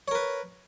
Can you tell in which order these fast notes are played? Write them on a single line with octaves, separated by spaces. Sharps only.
C#5 A#4 B4